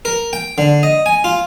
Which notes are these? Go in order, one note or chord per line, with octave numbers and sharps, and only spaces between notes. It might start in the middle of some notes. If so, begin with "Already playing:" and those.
A#4
G5
D3
D#5
G#5
F4